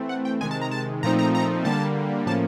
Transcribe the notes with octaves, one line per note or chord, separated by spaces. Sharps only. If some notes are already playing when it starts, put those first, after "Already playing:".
Already playing: E3 A3 C4
F#5
G5
C3 D#3 G#3 G#5
A5
A#5
A5
A#2 F3 A3 C4 D#4 A#5
A#5
A#5
D3 G3 A#3 A5
A2 F3 A#3 C#4 A5